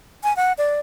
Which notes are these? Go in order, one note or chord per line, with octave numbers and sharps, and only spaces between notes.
G#5
F#5
D5